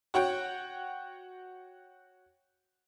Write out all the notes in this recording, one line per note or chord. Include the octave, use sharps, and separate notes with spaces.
F#4 C#5 F#5 G5